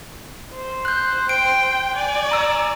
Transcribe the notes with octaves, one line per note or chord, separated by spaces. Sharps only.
C5
F#6 G6
G5 D7
D5 G#5
A#5 E6